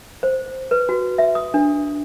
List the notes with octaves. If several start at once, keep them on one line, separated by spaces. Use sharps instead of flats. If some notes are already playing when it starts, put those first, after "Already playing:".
C5
B4
F#4
E5
D#6
D4